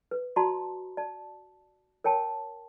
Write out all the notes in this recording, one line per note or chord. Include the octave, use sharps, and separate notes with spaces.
B4
F#4 D5 A5 A#5 C6
D5 A5
A#4 C#5 G5 A5